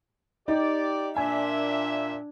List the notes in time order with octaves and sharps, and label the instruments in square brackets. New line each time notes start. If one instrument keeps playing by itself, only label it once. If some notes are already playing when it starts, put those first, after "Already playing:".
[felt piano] D#4 [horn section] G4 D5
[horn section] A#2 E5 [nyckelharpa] D4 [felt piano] G#5